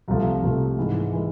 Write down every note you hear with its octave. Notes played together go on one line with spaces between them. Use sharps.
C2 C3 F3 A3
C2 C3 F3 A3
G#2 E3 G#3
E3 G#3